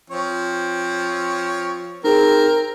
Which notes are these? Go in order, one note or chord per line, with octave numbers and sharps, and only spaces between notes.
F3 C4 C#5
C4 D#4 G#4 A#4